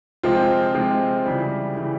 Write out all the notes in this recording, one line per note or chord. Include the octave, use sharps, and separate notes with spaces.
C3 F3 G#3 C4 F4
C3 F3 G#3 C4 F4
C#3 E3 G3
C#3 E3 G3